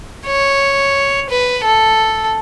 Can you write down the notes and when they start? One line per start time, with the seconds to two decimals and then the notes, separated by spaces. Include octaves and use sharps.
0.27 C#5
1.30 B4
1.64 A4